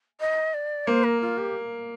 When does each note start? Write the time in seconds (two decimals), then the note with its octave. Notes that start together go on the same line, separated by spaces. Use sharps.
0.20 D#5
0.54 D5
0.87 A#3 C5
1.04 A#4
1.21 F4
1.38 G4